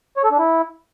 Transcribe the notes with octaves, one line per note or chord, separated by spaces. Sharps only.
C#5
A4
D4
E4